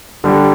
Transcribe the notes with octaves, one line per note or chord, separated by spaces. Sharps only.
D3 G3 D4 G4